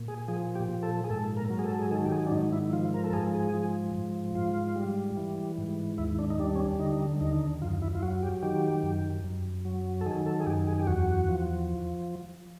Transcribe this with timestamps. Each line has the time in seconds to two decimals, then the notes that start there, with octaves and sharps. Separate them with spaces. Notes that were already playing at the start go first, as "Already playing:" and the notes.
Already playing: A#2
0.08 G#4
0.28 F3 G#4
0.55 G4
0.69 A#2
0.83 A4
1.04 G#4
1.10 G#2 A4
1.37 A#4
1.50 F#3
1.59 G#4
1.64 A4
1.79 G#4
1.91 D#3 A4
2.05 G4
2.12 G#4
2.27 D4
2.31 G#2 D#4
2.53 E4
2.73 F3 F4
2.94 A#4
3.04 A4
3.13 G#2 G#4
3.34 G#4
3.53 F3
3.95 G#2
4.35 G#2 F4
4.76 G3
5.17 E3
5.58 G#2
5.98 D#2 E4
6.19 D4
6.30 D#4
6.39 G3 D4
6.55 C#4
6.60 D4
6.79 D3 D#4
7.21 D#2 D#4
7.62 F#2 F4
7.82 E4
7.95 F4
8.03 F#3 F#4
8.23 G4
8.43 D#3 G4
8.83 F#2
9.24 F#2
9.65 F#3
10.01 A4
10.06 D#3 G#4
10.26 A4
10.40 G#4
10.46 F#2 G4
10.67 G#4
10.79 G4
10.87 E2 F#4
11.28 F3